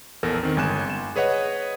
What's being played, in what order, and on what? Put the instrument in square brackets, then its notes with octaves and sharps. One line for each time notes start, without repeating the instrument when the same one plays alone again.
[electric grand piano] A#1 E2 A4 A#4
D#3 C4
G1 G#3 G#5 F#6 E7
G1 E7
G#4 B4 C#5 D#5 F#5